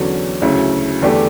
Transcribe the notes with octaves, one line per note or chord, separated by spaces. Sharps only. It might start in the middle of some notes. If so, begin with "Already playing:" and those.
Already playing: E2 D3 F#3 C#4
D2 C#3 F#3 C#4 E4
E2 D3 A3 D4 G4